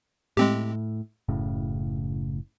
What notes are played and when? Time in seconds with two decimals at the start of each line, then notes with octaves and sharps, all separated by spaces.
0.37 A2 G#3 C4 G4
1.29 F#1 A2 C#3